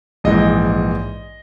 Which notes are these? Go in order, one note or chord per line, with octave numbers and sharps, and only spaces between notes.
A#1 G#2 E3 D#5